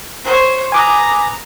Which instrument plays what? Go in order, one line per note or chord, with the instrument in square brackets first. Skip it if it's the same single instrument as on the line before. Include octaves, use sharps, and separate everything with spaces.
[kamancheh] C5 C#5
[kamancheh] B4 A#5 [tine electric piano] G#5 D6 D#6